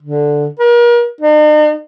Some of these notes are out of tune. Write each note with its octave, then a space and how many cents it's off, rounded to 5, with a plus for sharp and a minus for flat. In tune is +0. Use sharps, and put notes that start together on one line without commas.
D3 +0
A#4 +40
D#4 -45